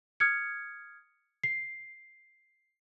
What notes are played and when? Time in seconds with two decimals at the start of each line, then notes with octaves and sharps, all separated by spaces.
0.20 D#6 F6 G#6 C#7
1.43 C7